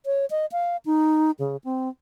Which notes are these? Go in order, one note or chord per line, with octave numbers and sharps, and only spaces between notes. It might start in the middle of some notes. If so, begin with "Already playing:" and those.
C#5
D#5
F5
D#4
C#3
C4